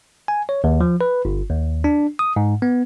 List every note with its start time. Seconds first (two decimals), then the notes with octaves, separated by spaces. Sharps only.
0.28 G#5
0.49 C#5
0.64 D#2
0.81 F3
1.01 B4
1.25 G1
1.49 D#2
1.84 D4
2.19 D#6
2.36 G#2
2.62 B3